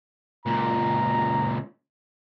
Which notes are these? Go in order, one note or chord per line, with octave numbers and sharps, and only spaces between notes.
C#2 A#2 A#5